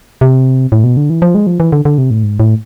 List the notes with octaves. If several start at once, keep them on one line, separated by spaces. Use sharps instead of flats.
C3
A2
B2
D3
E3
F3
G#3
F3
E3
D3
D3
C3
A2
G#2
A2